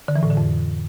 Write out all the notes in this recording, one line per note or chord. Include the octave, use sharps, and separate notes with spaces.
D3
E3
A2
D3
F2